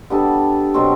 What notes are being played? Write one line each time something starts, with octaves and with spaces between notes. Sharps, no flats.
G3 B3 D4 A4
B2 F#3 C4